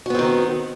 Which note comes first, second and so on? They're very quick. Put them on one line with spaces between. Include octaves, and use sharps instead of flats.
F#4 B3 C4 D#3